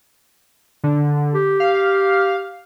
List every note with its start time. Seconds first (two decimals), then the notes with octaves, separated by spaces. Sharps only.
0.84 D3
1.35 G4
1.60 F5